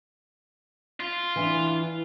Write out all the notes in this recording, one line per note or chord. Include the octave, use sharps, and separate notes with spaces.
F4
E3 D4